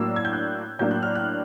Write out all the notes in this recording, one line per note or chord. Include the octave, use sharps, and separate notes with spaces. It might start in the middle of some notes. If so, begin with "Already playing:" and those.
Already playing: A2 F#3 A#3 D4 E6
G#6
G6
F#6
A2 F#3 A#3 D4 G6
F#6
F6
F#6